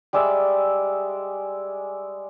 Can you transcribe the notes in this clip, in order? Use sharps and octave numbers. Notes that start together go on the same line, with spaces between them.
G3 G#3 D5 E5